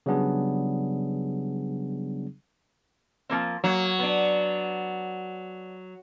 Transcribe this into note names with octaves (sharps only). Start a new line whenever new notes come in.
C#3 F#3 G3 B3 D4 G#4
F3 A#3 C4
F#3 A#3
B3 D4